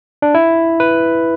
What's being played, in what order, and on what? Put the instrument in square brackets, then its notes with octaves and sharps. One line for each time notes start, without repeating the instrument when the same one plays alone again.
[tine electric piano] D4
E4
B4